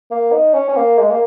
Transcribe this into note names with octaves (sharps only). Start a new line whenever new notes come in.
A#3
D#4
C#4
C#4
A#3
G#3
A#3